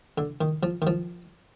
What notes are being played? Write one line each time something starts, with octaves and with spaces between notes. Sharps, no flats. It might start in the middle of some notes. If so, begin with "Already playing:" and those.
D3
D#3
F3
D#3
F3